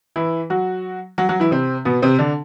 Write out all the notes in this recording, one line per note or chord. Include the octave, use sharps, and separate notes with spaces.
E3 E4
F#3 F#4
F#3 F#4
F#3 F#4
E3 E4
C3 C4
B2 B3
C3 C4
D3 D4